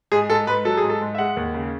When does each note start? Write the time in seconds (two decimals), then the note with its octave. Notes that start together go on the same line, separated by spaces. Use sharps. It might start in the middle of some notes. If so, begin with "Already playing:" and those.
0.12 G#2 G#4
0.30 G#2 A4
0.47 G#2 B4
0.65 F#3 A4
0.77 G#4
0.83 G#2
0.90 A4
1.01 G#2
1.15 E5
1.18 G#3 F#5
1.37 D#2
1.54 C#3